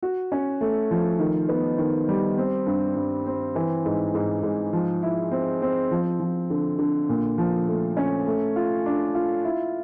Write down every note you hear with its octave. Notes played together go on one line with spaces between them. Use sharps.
F#4
C#4
A3
F3
D#3
B3
D#3
G3
C4
G2
G2
C4
E3
G#2
G#2
G#2
F3
E4
C4
C4
F3
F3
D3
D3
A#2
F3
A3
C#4
A3
F4
D4
F4
E4